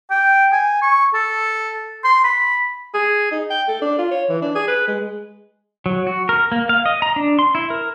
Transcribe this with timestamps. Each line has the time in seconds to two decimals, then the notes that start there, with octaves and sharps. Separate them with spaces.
0.11 G5
0.52 G#5
0.82 C#6
1.14 A4
2.04 C6
2.24 B5
2.94 G#4
3.32 D#4
3.50 G5
3.69 A4
3.82 D4
3.98 F4
4.11 C#5
4.29 E3
4.42 D4
4.55 G#4
4.68 B4
4.88 G#3
5.86 F#3
6.07 F#4
6.29 A#4
6.52 A#3
6.69 F5
6.86 D#5
7.02 A#5
7.16 D4
7.39 C6
7.55 E4
7.70 A#4